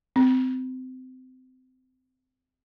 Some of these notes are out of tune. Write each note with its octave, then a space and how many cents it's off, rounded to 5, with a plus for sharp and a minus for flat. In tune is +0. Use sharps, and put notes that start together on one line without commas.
C4 -25